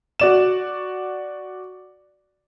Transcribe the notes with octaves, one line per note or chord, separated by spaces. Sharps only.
F#4 D5 E7